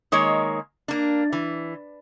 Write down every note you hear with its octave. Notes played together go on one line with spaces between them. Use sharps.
D#3 G#3 A#3 C#5
A#3 D4
E3